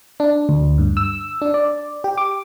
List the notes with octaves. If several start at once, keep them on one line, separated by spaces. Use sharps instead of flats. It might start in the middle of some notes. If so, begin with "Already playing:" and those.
D4
D2
G2
E6
D4
D5
G4
D6